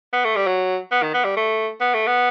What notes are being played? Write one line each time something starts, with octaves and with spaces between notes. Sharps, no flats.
B3
A3
G3
F#3
B3
D#3
B3
G3
A3
B3
A3
B3